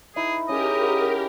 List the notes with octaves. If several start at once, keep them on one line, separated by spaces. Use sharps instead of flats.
D#4 E4 G#4 B4
C#4 G4 G#4 A#4 D#5
F#5